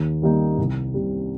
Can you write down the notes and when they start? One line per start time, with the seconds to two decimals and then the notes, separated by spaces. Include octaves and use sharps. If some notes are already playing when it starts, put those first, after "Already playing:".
Already playing: D#2
0.22 D#3 G3 A#3 D#4
0.58 C2
0.94 C3 G3